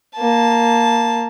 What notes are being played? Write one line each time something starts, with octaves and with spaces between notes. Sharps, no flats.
A#3 A5